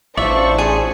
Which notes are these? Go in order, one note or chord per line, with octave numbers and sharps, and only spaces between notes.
A1 D4 F4 C5 D5 E5 C#6
G#4